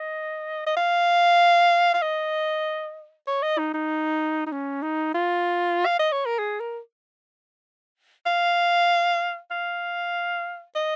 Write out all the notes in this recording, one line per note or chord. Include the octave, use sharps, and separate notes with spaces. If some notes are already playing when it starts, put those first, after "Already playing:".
Already playing: D#5
D#5
F5
F5
D#5
C#5
D#5
D#4
D#4
D#4
C#4
D#4
F4
F5
D#5
C#5
A#4
G#4
A#4
F5
F5
D#5